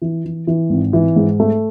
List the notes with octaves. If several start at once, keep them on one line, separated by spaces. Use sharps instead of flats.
E3
E3
E3
G#1
E3
G#2
A3